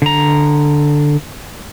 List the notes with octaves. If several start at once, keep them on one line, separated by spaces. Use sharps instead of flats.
D3 A#5